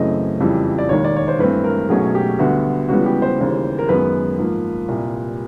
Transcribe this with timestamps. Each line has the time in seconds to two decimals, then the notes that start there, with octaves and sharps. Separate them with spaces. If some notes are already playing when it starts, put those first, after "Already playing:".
Already playing: F#2 C#3 E3 A3 C4 D#5
0.40 F2 C#3 E3 G3
0.79 D5
0.89 E1 D#2 D#3 C#5
1.05 D5
1.16 C#5
1.28 C5
1.39 G2 E3 A3 C4 B4
1.64 A#4
1.89 B1 B2 F#3 A3 C#4 G#4
2.15 G4
2.39 D2 D3 G3 B3 F#4
2.88 C#2 C#3 E3 G3 B3 F#4
3.06 G4
3.22 C5
3.38 D#2 C#3 E3 G3
3.79 A#4
3.89 F#2 D#3 G#3 B3 B4
4.38 G#2 F3 A#3
4.88 C2 A#2 G3